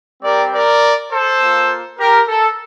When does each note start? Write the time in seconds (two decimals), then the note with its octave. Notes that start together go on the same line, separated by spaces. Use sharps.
0.23 G3 C4 G4 A#4 D5
0.53 A#4 D5
1.11 A4 C5
1.41 A#3 F4
1.99 G4 A#4
2.28 A4